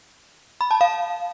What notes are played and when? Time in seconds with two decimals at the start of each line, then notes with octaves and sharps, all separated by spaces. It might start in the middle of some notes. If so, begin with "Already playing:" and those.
0.61 B5
0.71 A5
0.81 F5